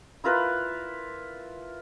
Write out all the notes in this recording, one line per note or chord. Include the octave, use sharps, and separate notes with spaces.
E4 F4 A#4 B4